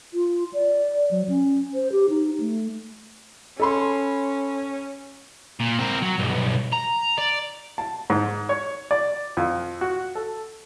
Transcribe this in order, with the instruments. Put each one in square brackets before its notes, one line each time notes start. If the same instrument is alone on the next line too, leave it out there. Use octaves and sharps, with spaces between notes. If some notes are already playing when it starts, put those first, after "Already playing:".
[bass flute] F4
D5
F#3
C#4
C5
G4
D#4
A3
[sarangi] C#4 [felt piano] A4 B5 C6
[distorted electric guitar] A#2
C4 A#4
F#3
B1 G2
A#5
D5
[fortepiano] A5
G#2
C#5
D5
F2
F#4
A4